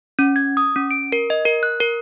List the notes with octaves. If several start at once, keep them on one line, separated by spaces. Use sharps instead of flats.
C#4
G#6
D#6
C#4
D7
A#4
D#5
A#4
F#6
A#4